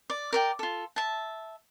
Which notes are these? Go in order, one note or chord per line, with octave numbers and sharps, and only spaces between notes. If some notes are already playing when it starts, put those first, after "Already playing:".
D5
A#4 D5 G5
F4 A4
E5 A5